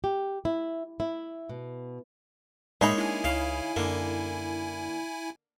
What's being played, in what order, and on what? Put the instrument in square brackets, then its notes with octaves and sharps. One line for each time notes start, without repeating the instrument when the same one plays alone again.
[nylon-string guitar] G4
E4
E4
B2
[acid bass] A2 [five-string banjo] G#3 D#4 B5 [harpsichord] A#3 G#4 C#5 [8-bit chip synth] E5
[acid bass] D4 [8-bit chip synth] E4 G#5
[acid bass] C#2 [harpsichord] C#3 F5
[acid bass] F#2 [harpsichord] D3 A#3